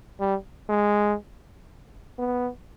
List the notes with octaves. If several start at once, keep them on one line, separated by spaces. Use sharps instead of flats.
G3
G#3
B3